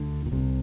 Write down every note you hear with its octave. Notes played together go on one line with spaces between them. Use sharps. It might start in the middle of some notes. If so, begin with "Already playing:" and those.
Already playing: D2 D3
A#2
C2 C3